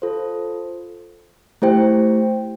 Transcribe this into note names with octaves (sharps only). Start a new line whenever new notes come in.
F4 A4 C5
A3 E4 G4 C5 G5